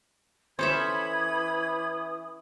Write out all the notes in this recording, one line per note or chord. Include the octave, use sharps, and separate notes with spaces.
E3 C#4 A4 C5 E5 B5 D#6 G#6